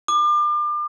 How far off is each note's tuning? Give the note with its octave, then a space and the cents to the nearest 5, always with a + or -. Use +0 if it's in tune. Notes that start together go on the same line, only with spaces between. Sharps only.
D6 +35